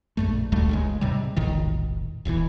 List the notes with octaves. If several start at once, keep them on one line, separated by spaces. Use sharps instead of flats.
A#1 F#2 A3
G#1 D2 G3 A3
F#1 C#2 G#3
G#2 C3 G3
E1 A#1 A2 D#3
D1 B1 C3 E3